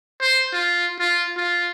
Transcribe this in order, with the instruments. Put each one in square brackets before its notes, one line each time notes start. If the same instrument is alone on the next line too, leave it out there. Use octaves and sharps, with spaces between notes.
[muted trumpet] C5
F4
F4
F4